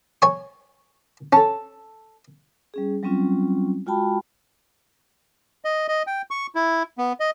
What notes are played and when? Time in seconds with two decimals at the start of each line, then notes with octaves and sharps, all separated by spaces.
0.22 C#5 G#5 C#6
1.33 C#4 A4 A5
2.74 G3 C#4 G#4
3.03 F#3 G3 C4 C#4 F4
3.86 G#3 F4 F#4 G5 A5 B5
5.65 D#5
5.88 D#5
6.07 G5
6.31 C#6
6.55 E4
6.98 B3
7.20 D#5